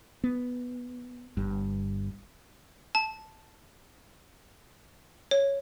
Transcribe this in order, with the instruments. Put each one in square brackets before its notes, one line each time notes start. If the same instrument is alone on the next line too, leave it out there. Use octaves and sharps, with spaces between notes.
[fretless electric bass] B3
G1 G2
[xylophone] A5
C#5